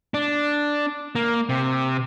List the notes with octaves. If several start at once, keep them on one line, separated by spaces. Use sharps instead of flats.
D4
A#3
C3